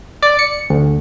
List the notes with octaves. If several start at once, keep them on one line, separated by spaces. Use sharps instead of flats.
D5
C#7
D2